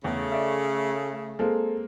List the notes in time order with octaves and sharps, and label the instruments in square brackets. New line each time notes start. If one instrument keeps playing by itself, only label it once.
[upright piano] E2 [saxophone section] C#3 A3
[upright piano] D5 E5
[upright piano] G#3 A#3 C4 [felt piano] A4